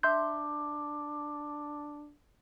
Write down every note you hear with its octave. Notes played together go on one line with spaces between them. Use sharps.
D4 E5 C6 G6